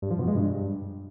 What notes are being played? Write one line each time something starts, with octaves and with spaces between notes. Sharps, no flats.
G2
F3
B2
G#3
G2